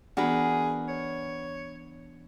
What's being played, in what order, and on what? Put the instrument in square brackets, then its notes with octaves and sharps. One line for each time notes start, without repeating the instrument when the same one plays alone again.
[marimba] E3 B3 [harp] D4 [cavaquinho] F#4 A#4 B4 [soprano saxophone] G#4
[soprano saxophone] C#5